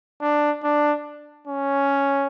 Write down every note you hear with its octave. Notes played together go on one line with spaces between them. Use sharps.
D4
D4
C#4